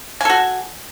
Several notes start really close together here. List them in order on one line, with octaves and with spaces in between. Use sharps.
G#5 A4 F#4